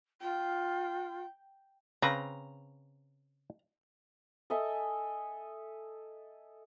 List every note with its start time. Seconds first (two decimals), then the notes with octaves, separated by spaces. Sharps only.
0.21 F4 G5
2.02 C#3 C4 B4 A#5
4.50 A4 D#5 E5 G#5